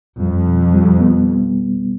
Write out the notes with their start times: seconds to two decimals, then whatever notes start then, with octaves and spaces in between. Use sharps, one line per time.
0.20 F2 G3
0.47 B2
0.74 G3
1.01 B3